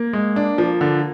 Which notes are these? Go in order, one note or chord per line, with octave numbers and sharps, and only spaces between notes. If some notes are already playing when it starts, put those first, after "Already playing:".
Already playing: A#3
G#3
D4
F3
D3